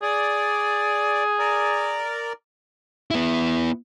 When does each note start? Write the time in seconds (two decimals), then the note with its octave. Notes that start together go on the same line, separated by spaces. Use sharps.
0.02 G#4 D5
1.39 A#4 D5
3.11 B3 E4